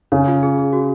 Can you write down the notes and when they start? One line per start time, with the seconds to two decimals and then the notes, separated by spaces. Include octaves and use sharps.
0.12 C#3 C#5
0.28 F4
0.43 G#4
0.58 G#4
0.73 F#4